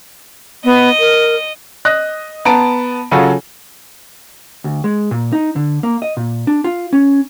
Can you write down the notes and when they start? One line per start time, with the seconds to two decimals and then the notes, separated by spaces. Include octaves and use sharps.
0.65 B3 D#5
1.00 A#4
1.85 D#5 F#6 A#6
2.45 B3 A5 A#5 D7
3.11 C#3 F#3 F4 F#4 G#4 A4
4.64 D2
4.84 G#3
5.11 A#2
5.33 D#4
5.56 D3
5.83 A#3
6.02 D#5
6.17 A#2
6.47 D4
6.64 F4
6.93 C#4